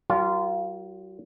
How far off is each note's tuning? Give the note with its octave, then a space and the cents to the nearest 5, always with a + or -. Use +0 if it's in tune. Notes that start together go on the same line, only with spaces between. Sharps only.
F#3 +40 F4 -15 A#4 +0